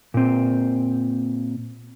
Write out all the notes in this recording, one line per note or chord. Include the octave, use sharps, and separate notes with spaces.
A#2 C4